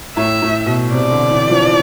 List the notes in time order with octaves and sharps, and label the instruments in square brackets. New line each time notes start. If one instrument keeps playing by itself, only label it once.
[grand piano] A2 [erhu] E5
[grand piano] A2
B2
[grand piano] C3 [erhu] D5
[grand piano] D3
E3
F3